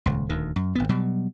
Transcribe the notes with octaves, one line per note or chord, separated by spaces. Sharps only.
D#1 C#2
D#1 D2 D#3
F#2
G#1 D2 B3
B2 F#3 G3